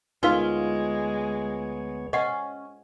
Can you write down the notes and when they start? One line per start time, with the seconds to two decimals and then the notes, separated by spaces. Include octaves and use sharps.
0.23 D2 G#3 B3 D#4 F4 A#4 C#5 F5
2.13 C#4 D#5 F#5